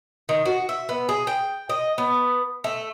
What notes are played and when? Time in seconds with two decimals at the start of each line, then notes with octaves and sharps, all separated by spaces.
0.29 D#3
0.45 F#4
0.69 E5
0.89 B3
1.09 G#4
1.27 G5
1.69 D#5
1.98 B3
2.64 A3